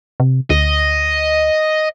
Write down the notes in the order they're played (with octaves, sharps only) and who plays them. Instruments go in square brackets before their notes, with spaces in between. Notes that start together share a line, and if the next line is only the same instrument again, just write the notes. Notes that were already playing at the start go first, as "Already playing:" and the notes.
[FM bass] C3
[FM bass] D2 [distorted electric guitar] D#5